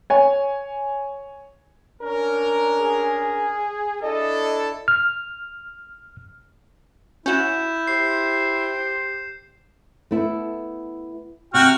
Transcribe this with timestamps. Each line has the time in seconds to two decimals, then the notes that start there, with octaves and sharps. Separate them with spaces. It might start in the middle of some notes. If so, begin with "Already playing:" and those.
0.10 C#5 G#5
2.02 C#4 D4 A#4
2.80 G#4
4.02 D4 E4 A4 D#5
4.88 F6
7.26 C#4 E4 F#4 G6 E7
7.88 G4 C5 C7
10.11 A3 B3 E4
11.54 C3 F#4 G5 F6